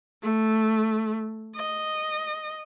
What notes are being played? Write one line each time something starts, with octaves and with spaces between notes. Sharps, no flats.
A3
D#5